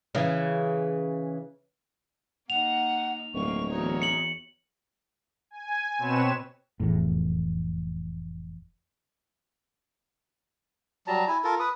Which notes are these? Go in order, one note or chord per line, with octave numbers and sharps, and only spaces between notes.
C#3 E3
A#3 D#4 F#5 F7
D1 G2 F3 A#3 C#6
E2 D#4 F#4 C#5
C#7 F#7
G#5
B2 C4 B4 C#5 E7
F1 E2 A2
F#3 G3 A5 A#5
E4 G#5
F4 A4 A#4
B4 D#6